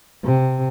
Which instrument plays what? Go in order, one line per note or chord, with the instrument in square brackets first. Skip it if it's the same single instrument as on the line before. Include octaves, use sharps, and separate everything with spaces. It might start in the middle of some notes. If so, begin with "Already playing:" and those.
[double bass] C3